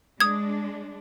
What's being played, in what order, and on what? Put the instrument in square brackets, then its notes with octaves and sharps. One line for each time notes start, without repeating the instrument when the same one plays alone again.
[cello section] G#3 D4 [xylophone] D#6 G#6